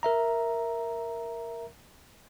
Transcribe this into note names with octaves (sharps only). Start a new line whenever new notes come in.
A#4 E5 A#5